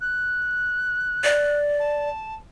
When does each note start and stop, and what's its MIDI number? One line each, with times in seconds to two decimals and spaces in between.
0.01 1.58 90
1.24 2.09 74
1.80 2.35 81